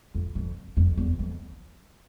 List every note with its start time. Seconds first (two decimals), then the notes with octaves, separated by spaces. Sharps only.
0.15 F2
0.35 F2
0.77 F2
0.97 E2
1.19 F2